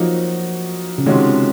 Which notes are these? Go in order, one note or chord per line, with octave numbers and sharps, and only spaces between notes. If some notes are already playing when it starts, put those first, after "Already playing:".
Already playing: F3 F#3 A#3 D#4 F#4
C#3
C3 D#3 F3 G#3 C#4 F#4